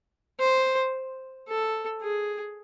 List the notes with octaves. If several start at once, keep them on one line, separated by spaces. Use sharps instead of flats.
C5
A4
G#4